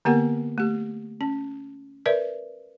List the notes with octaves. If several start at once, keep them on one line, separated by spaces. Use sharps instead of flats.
D3 A#3 B3 G4 A#4 F#5
A3 G4
C#4
A#4 B4 D5 E5